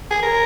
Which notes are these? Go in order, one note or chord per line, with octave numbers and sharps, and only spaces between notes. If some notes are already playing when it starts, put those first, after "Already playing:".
G#4
A#4